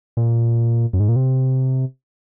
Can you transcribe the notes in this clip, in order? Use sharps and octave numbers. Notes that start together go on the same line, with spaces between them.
A#2
F#2
G#2
A#2
C3